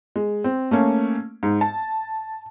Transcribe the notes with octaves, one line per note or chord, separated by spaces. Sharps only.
G#3
C4
A3 A#3 C#4
G#2
A5